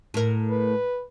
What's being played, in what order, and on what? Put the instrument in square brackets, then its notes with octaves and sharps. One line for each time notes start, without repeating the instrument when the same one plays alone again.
[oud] A2 A#4
[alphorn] B4